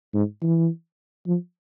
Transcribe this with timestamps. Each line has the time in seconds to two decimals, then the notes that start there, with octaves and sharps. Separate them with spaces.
0.14 G#2
0.42 E3
1.27 F3